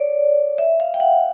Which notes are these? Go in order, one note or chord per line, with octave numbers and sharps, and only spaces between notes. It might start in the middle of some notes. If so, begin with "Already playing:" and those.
Already playing: C#5 D5
E5
F5
G5
F#5